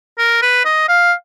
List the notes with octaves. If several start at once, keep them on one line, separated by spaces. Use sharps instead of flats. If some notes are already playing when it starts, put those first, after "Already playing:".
A#4
B4
D#5
F5